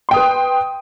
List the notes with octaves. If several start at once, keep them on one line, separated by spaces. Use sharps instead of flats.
B4 G5 C6 D#6